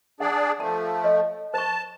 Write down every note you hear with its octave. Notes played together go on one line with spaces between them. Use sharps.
D4 G#4 D5 F#5
F3 A3 A5
C#5 D#5
C5 A5 C#6